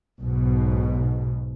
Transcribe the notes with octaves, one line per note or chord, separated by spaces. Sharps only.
B1 G#2 B2